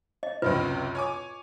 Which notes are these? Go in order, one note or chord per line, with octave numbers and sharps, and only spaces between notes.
D#5
C#2 F#2 C3 F4 B4
C#5 G#5 D6